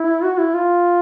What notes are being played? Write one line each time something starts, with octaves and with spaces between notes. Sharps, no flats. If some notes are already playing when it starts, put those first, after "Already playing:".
Already playing: E4
F#4
E4
F4